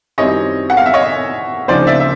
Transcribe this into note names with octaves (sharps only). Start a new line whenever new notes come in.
F#2 D#3 G3 C4 E4 C#5 D#5
F#5
F5
E5
C#5 D#5
D2 C#3 F3 A#3 D#4 C5 D5
D5 E5
E5